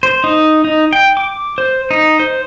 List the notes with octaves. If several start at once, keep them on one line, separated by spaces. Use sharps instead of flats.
C5
D#4
D#4
G5
D6
C5
D#4
C5